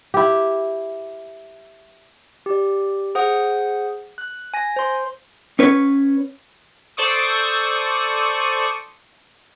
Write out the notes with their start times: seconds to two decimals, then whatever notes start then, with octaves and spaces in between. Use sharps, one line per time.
0.14 E4 G4
2.46 G4 D5
3.15 G#4 C5 F#5 D#6
4.18 F#6
4.54 G#5 A#6
4.76 C5 C6
5.59 C#4 B4 C#5
6.97 A4 C5 D5 C#6 D#6